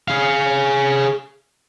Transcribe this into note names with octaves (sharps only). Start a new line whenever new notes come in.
G#4 F5